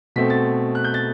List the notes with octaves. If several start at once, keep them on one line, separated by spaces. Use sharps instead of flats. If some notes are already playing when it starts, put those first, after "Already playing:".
B2 A3 C4 B6
A6
F#6
G6
A6